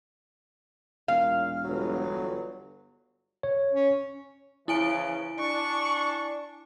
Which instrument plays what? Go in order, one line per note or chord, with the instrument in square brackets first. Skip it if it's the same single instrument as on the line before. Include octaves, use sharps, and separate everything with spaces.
[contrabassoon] E1 [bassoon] A#2 [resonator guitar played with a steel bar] F5
[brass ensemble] G1 [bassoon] F#3
[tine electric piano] C#5
[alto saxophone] C#4
[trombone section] C#3 E3 F3 [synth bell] E4 G#5 D7
[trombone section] D4 [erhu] C#6